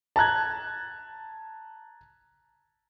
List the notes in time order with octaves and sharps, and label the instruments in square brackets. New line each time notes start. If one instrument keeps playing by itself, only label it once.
[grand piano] A5 A#5 F#6 G#6